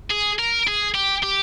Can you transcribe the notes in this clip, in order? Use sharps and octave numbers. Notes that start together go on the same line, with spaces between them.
G#4
A#4
G#4
G4
G4